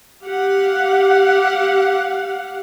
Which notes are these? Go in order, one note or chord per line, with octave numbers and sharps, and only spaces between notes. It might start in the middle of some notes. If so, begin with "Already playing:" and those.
G4 F5 F#5